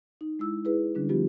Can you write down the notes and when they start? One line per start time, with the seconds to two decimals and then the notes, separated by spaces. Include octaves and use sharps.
0.21 D#4
0.39 G#3 E4 E6
0.65 E4 G#4 B4
0.95 D3 G3 C#4 D4
1.09 F3 G3 B3 D#4 F4 G4